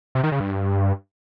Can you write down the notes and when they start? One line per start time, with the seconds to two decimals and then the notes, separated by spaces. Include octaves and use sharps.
0.15 C3
0.23 D#3
0.32 C#3
0.40 G2